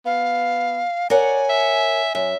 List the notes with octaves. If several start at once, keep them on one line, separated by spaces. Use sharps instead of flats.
B3 F5
A#4 C#5 D5 F#5 G#5
E5
F#2 E5